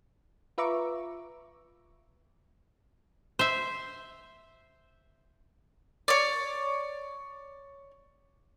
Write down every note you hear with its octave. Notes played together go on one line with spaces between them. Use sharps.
F4 B4 E5 A#5 C#6 D6
C5 E5
C#5 D5